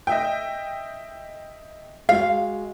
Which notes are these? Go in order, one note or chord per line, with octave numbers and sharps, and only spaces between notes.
D#5 E5 G5
G#3 F#4 F5